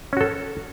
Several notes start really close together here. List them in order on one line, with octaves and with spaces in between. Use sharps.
C#4 F#4 A4